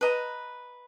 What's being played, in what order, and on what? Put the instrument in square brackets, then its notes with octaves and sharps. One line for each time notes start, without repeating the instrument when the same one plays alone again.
[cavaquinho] B4 D#5 A#5